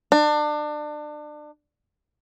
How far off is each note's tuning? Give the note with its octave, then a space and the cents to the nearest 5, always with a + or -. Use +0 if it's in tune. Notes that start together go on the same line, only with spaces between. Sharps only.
D4 +30